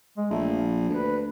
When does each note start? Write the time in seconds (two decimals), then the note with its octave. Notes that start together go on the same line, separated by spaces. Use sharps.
0.17 G#3
0.31 A#1 A3
0.49 F3
0.89 D2 B4